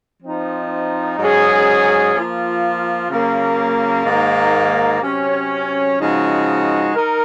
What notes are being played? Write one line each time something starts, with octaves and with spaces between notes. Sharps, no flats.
F3 C4 D#4
G#2 F#3 C#4 G#4
F3 A#3 F4
C#3 F#3 A#3
G#2 D#3 A#3
C3 F#3 C#4
C#3 F3 G#3 D#4 F#4
D#4 A#4